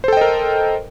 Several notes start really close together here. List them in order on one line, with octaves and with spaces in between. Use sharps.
C5 A4 G5 D#5 A#4